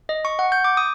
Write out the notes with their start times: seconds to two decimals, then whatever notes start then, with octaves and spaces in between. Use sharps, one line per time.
0.09 D#5
0.25 C#6
0.39 F#5
0.52 G6
0.64 D6
0.77 D#6